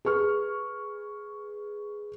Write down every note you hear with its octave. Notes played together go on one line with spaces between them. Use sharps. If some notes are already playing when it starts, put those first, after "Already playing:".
G#4 B4 C#6 F6